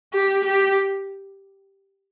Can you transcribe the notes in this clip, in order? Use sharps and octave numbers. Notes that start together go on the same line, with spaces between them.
G4
G4